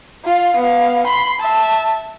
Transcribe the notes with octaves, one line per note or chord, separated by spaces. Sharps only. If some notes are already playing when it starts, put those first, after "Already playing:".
F4 F5
B3 F5
B5 C6
E5 A5